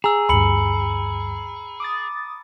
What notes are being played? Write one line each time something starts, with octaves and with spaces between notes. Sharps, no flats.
G#4 A#5 E6
D2 G2 B5 C#7 F#7
D6 D#6 A6